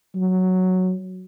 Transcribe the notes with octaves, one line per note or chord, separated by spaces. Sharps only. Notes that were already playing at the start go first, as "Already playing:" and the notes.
F#3